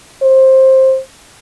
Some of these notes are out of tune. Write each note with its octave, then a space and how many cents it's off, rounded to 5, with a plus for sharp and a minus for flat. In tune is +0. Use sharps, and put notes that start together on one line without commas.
C5 +15